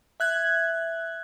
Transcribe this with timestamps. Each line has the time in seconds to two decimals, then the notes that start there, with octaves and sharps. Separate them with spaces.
0.20 E5 F#6 G#6